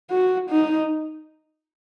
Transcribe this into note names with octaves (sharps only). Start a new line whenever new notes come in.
F#4
D#4